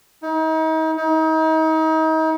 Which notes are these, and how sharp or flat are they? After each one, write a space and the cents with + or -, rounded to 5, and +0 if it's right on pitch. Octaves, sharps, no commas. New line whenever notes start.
D#4 +35
D#4 +35